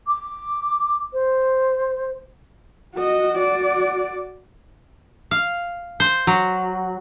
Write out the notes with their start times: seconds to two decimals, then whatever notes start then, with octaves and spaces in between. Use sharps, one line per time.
0.07 D6
1.13 C5
2.96 F#4 D#5
3.38 F#4 D5
5.31 F5
6.00 C5
6.27 F#3